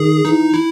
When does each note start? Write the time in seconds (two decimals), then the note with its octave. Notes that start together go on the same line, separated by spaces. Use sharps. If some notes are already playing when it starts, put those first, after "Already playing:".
Already playing: D#3 G#4
0.25 E3 D#4
0.54 E4